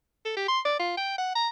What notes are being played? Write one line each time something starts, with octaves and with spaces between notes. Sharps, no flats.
A4
G4
C6
D5
F4
G5
F#5
A#5